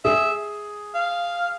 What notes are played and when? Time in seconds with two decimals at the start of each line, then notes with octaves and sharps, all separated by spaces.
0.04 G#4 E5
0.94 F5